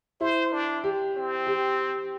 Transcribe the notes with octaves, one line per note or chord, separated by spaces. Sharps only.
E4 C5
D4
G4
C4
G4